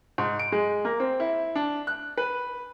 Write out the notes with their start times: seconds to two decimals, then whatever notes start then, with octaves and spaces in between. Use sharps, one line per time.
0.18 G#2
0.39 D7
0.52 G#3
0.85 A#3
1.00 C4
1.20 E4
1.55 D4
1.87 F#6
2.17 B4